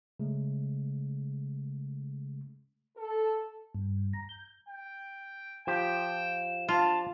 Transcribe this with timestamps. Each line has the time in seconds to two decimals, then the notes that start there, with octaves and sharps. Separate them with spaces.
0.20 C#3 G#3 A3
2.97 A4
3.75 G2
4.13 A#5
4.29 G6
4.69 G5
5.67 F3 G4 G5 E7
6.68 D4 F4 A5